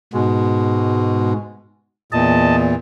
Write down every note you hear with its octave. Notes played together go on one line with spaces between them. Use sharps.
G#2 B2 G#3
E2 A#2 D#5 A5